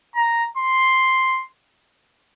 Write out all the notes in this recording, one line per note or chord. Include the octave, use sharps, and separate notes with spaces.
A#5
C6